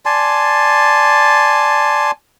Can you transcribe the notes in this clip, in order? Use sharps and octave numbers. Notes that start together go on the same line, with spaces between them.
D5 G#5 A5 C6